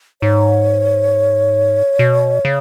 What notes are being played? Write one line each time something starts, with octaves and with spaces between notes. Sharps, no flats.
G#2 C#5
B2
C#3